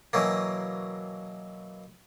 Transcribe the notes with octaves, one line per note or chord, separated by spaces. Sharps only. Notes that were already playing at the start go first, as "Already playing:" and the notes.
B2 E3 F#3 A#3